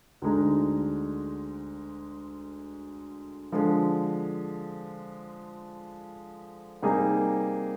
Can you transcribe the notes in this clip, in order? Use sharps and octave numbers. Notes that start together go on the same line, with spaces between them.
D2 D3 G#3 D#4
D3 F3 G#3
C3 G3 A#3 D#4 G#4